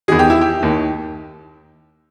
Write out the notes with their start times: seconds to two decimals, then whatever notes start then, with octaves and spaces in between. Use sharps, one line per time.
0.08 E2 D#3 G#4
0.19 G4
0.30 E4
0.41 G4
0.62 D#2 D#3